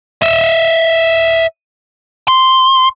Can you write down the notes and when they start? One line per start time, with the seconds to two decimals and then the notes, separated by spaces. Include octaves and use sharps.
0.22 D#5 E5
2.28 C6